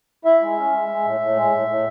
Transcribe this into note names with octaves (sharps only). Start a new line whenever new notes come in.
E4 E5
G#3
C#4
G#3
G#3
A2
A2
G#3
A2
A2